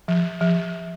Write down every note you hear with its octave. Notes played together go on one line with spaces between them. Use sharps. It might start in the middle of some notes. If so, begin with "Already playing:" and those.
F3
F3